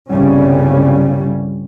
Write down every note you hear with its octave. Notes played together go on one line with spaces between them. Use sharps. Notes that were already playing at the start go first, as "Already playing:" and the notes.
G1 C2 C#3 G3 C#4